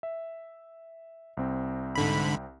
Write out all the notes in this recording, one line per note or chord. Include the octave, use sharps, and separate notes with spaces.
E5
C2 C4
G#2 D3 B5